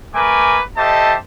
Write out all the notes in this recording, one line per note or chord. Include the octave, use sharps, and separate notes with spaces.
A3 A#4 B4 G#5 D6
G4 A4 C5 D#5 E5 A5